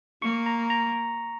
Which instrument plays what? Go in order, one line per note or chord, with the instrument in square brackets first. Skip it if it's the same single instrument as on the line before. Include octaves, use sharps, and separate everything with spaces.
[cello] A#3 [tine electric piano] C#6
[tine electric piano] A#5
A#5